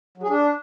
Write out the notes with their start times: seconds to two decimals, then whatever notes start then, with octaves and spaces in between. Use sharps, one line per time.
0.18 F#3
0.23 G#4
0.29 D4